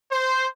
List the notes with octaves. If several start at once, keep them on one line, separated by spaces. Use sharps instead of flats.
C5